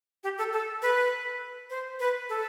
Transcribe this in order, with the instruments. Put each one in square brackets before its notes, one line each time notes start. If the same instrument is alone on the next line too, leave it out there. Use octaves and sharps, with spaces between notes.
[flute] G4
A4
A4
B4
C5
B4
A4